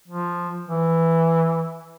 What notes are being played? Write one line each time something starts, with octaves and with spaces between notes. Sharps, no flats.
F3
E3